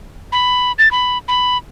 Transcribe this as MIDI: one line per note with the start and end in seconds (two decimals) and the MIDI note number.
0.32 0.72 83
0.79 0.89 93
0.91 1.18 83
1.28 1.57 83